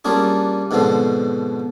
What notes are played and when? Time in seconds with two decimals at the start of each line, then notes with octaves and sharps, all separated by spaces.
0.05 G3 A#3 C#4 D4 F4 G#4
0.71 G#2 B2 D3 F3 C4